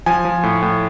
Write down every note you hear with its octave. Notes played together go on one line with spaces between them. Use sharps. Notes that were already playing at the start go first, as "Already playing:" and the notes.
F3 G#5
F3
A2
A2